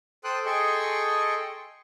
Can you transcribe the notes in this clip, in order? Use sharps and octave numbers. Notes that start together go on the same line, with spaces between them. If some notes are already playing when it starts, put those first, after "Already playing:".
A4 C5 G5 C6 D#6 F#6
G#4 A4 D#5 G5 C6 C#6